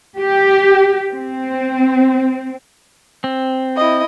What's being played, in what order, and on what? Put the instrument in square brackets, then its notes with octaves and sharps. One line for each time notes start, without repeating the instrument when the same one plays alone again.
[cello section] G4
C4
[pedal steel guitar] C4
[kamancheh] E4 D#5